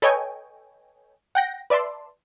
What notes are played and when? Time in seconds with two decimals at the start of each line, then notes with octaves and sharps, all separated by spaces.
0.02 A4 B4 C#5 D#5 G5 G#5
1.35 F#5 G5 A#6
1.70 B4 D5 E5 A5 C6